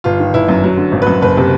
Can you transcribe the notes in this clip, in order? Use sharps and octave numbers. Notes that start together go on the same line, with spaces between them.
G1 F4
D#3
G1 E4
F#2
F#3
D3
G#1
F#2 B4
F#1 B4
C3